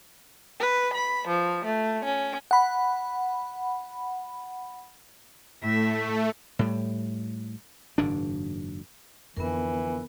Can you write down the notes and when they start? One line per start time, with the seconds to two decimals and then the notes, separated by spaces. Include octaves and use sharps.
0.60 B4
0.94 B5
1.28 F3
1.66 A3
2.05 C#4
2.51 F#5 B5
5.63 A2 A3 E5
6.59 A2 G3
7.98 F#1 G#2 D#3 D4
9.37 F2 D3 E3 B3 A#4